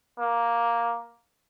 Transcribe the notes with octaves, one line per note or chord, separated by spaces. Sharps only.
A#3